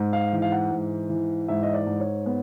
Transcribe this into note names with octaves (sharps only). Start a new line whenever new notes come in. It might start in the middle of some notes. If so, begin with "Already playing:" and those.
Already playing: G#2
F5
E3
F5
F#5
G#2
E3
G#2 E5
D#5
D5
G#2
C#5
B3